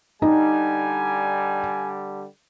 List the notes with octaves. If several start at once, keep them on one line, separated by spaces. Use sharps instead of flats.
D3 G3 D#4 G#5